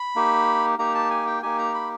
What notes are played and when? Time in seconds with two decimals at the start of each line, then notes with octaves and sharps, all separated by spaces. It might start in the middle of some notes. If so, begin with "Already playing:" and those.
Already playing: B5
0.16 A#3 D#4 G4
0.79 A#3 D#4 G4 A#5
0.95 A5
1.11 G#5
1.27 G5
1.42 A#3 D#4 G4 G#5
1.58 A#5
1.74 B5